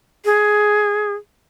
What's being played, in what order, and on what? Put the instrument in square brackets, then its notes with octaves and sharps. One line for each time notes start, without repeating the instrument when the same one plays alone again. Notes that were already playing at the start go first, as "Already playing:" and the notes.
[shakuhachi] G#4